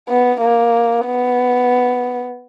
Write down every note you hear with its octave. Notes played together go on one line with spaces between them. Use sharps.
B3
A#3
B3